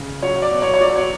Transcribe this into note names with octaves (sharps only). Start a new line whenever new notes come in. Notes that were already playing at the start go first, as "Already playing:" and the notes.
Already playing: C#3
F#3 C#5
D5
B2
C#5
C#5
F#3 D5
C#5